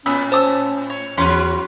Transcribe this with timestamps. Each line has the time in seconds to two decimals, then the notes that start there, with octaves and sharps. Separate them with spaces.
0.06 A2 B3 C#4 E6
0.32 C#4 C5 A5 D#6 E6
0.90 C#5
1.18 E2 E3 F#3 C#4 B4 C6